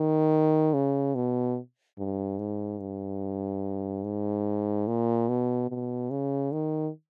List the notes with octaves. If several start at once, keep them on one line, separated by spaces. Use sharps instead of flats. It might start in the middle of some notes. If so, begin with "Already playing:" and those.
Already playing: D#3
C#3
B2
G2
G#2
G2
G#2
A#2
B2
B2
C#3
D#3